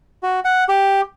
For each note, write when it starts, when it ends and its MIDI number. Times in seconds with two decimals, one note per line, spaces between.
0.23 0.40 66
0.45 0.64 78
0.69 1.01 67